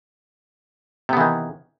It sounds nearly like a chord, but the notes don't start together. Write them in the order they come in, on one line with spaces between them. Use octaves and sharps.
C3 B3 E3 D#3